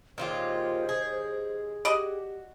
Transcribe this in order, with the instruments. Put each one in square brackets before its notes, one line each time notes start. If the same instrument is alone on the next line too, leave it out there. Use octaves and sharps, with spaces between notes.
[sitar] D#2 G#3 [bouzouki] A#2 F4 G4 [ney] C5
[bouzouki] G#4
[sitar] F#4 [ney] G4 [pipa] D5 D#5